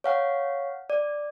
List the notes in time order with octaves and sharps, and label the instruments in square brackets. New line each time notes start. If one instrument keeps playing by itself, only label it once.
[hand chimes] C#5 F5 F#5
D5